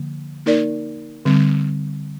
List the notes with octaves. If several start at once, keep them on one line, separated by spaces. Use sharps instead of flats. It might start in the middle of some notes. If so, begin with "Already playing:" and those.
Already playing: D3 F3 A#3
A#3 D#4 A#4 D5
D3 G3 C4